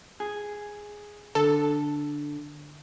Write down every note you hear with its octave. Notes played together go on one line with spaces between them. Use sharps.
G#4
D3 A4